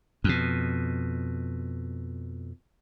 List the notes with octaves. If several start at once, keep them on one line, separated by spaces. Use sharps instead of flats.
F2 B2